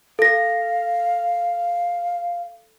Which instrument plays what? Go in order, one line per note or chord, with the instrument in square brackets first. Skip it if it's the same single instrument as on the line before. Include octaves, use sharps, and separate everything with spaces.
[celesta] A4 A#6 [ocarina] F5